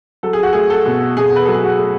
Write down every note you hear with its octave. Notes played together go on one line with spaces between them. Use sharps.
F#3 A4
G#4
F#4
A3 G#4
A4
B2
B2 G#4
B4
F#3 A4
G#4
F#4
A3